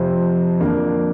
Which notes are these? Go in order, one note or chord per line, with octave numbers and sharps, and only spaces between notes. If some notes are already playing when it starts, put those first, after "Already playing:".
Already playing: F2 C3 F3 C4
F2 D3 F3 A#3 D4